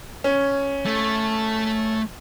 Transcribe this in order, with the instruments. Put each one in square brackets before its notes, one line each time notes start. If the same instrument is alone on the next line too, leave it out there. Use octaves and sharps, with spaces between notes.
[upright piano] C#4
[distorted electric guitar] A3